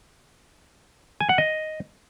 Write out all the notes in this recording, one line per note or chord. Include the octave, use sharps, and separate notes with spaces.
G#5
F#5
D#5